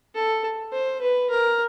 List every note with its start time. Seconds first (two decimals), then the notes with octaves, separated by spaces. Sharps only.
0.15 A4
0.73 C5
1.02 B4
1.30 A#4